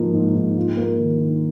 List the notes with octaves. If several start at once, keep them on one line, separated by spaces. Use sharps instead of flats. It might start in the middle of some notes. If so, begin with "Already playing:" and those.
Already playing: G#2 F3 A#3
G#2
G#2
F4
A#3
D#3
D#3